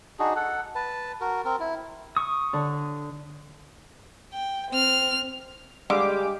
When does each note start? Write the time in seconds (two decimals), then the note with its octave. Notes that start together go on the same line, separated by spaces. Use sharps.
0.19 D4 D#4 F#4 G#4
0.36 A4 F#5
0.75 B4 A5
1.21 F#4 A#4
1.45 C4 A#4
1.60 E4
2.17 C#6 D#6
2.53 D3
4.33 G5
4.71 C4 F6
5.90 D3 G3 G#3 G4 F5 D6